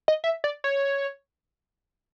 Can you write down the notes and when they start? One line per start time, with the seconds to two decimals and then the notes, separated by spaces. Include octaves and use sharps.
0.08 D#5
0.24 E5
0.44 D5
0.64 C#5